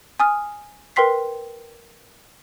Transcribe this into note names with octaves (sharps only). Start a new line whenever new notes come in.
G#5 D#6 F6
A#4 B4 G5 C6 B6 C7